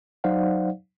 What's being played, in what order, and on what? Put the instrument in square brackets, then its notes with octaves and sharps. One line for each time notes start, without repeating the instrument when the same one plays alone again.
[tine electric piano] F#3 D#4 C5 D5 F5 F#5